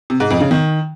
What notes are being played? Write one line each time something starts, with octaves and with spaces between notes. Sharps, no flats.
C3
G#2
F2
C#3
D#3